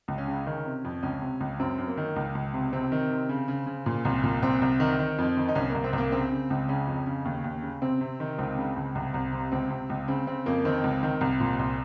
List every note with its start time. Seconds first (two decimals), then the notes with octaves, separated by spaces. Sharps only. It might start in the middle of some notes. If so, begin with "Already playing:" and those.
0.08 C#2
0.18 C#4
0.27 C#3
0.46 D#3 C#4
0.65 C3
0.85 F2
1.03 C#2 C#4
1.22 C3
1.40 C#2
1.60 F#2 C4
1.79 F#2
1.88 A#3
1.97 D#3
2.16 C#2
2.35 C#2
2.53 C3
2.73 C3 C4
2.92 D#3
3.10 C3
3.29 C#3
3.48 C#3
3.66 C#3
3.86 A#2
4.05 C2
4.24 A#2
4.42 C2 C4
4.62 C2
4.80 D#3
4.99 D#3
5.18 F2
5.37 D#3
5.49 D#4
5.55 C2 C#4
5.70 C2 A#3
5.84 C4
5.93 C2
5.98 A#3
6.12 C#3 C4
6.31 C#3
6.50 C#2
6.69 C#3 C#4
6.87 F2
7.06 C#3
7.25 D#2
7.44 D#2
7.63 C#3
7.82 C3 C4
8.01 C3
8.20 D#3
8.38 C#2 C4
8.58 C#3
8.76 C#2
8.95 C2
9.14 C2
9.32 C3
9.52 C#2 C4
9.70 C3
9.90 C#2
10.08 C#3 C4
10.27 C#3 C4
10.46 F2 A#3
10.65 D#3 C4
10.84 C#2
11.03 D#3
11.21 C2
11.40 A#2
11.59 C2